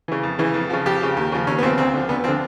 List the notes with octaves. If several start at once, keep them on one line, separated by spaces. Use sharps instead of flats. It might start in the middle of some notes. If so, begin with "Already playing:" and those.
C#3 E3
F2
C#3 E3
F2
C#3 F3
F2 G4
C#3 F3
D#2
C#3 F3
D#2 C#4
B3
C#3 F3 C4
D2 C4
D3 F3
D2 B3
D3 F3 C4